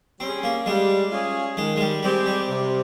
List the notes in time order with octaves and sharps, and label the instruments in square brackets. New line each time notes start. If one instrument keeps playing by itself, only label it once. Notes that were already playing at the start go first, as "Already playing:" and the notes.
[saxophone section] G3 C#4 G#4 [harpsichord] C4
[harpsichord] A#3
[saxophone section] G3 [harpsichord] G#3
[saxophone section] C#4 F4 G#4
[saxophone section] D#3 [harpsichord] G#3
[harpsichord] G#3
G3
[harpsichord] G3 [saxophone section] G#3 C4 G4
[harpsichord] G3
[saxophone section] C3